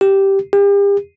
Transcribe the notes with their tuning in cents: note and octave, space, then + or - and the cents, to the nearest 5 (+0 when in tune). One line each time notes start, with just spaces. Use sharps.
G4 -5
G4 +40